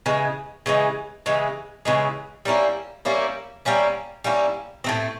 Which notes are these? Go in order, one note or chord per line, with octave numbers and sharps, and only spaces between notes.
C#3 E3 G#3
C#3 E3 G#3
C#3 E3 G#3
C#3 E3 G#3
G3 A#3 C#4 E4
G3 A#3 C#4 E4
G3 A#3 C#4 E4
G3 A#3 C#4 E4
A2 F#3 A3 C4